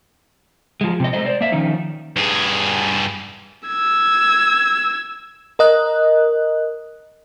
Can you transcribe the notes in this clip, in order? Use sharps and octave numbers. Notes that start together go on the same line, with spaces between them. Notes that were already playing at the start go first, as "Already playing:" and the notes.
F3 G#3
C3 D#5
G#3 A3 C5 D#5
C5 D5
A#3 E5
D#3 F3 C#4 D#4
G2 G#4
E6 G#6
A#4 D#5 F#6